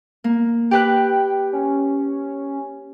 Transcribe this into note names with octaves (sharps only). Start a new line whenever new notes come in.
A#3
G4 B4 G5 F#6
C#4